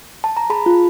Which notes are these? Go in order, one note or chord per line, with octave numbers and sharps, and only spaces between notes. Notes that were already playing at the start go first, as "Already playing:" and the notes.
A5
A#5
G#4 A5 B5
F4